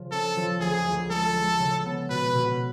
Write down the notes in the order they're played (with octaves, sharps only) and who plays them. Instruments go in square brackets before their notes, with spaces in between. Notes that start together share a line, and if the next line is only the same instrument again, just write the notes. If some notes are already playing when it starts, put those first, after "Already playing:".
Already playing: [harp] C#3 F3
[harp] C#4 [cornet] A4
[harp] F3
[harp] D2 [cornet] G#4
[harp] D2
[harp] G#3 [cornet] A4
[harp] G#3
C#3
B3
[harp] B2 [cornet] B4
[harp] B2